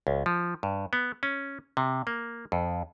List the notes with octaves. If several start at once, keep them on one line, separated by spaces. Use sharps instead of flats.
C#2
F3
G2
B3
C#4
C3
A#3
F2